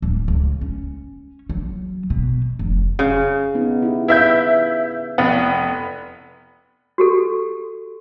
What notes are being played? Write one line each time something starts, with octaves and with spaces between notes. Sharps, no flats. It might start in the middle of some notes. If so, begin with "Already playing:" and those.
D1
C#2
C#4
F#3
B2
F1
C#3
B3 D#4
E4 G4
E4 B4 E5 F5 G6
F1 B3
F#4 G4 A4